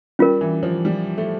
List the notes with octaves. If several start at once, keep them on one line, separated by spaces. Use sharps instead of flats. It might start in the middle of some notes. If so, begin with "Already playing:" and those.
G3 C#4 F4 A#4
E3
F3
G3
A3